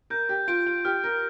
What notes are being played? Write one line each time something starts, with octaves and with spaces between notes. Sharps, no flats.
A#4 G6
G4
F4 D7
F4
G4 F6
A#4